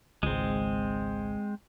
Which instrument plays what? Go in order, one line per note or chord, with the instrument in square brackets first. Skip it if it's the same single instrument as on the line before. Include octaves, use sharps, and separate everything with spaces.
[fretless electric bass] G#1 C#2 [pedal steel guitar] G#3 C4